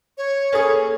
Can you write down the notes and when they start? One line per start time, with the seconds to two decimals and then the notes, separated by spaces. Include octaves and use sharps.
0.18 C#5
0.52 A#3 C#4 G#4 A4 B4